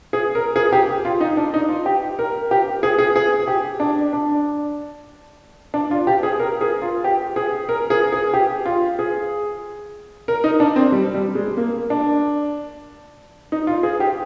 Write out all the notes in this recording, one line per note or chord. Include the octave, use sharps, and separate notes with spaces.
G#4
A#4
G#4
G4
F4
D#4
D4
D#4
F4
G4
A#4
G4
G#4
G#4
G#4
G4
D4
D4
D4
F4
G4
G#4
A#4
G#4
F4
G4
G#4
A#4
G#4
G#4
G4
F4
G#4
A#4
D#4
D4
C4
G3
G3
G#3
A#3
D4
D#4
F4
G#4
G4